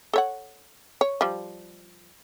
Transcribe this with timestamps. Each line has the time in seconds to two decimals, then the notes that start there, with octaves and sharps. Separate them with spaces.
0.13 A4 C#5 F#5
1.01 C#5
1.21 F3 G3